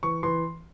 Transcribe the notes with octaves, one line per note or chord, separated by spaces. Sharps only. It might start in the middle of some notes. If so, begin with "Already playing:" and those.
E3 C#6
E3 C6